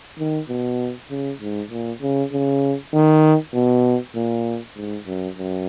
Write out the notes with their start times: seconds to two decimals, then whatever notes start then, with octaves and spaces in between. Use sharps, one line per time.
0.19 D#3
0.49 B2
1.11 C#3
1.41 G#2
1.71 A#2
2.02 C#3
2.32 C#3
2.94 D#3
3.54 B2
4.16 A#2
4.76 G#2
5.07 F#2
5.38 F#2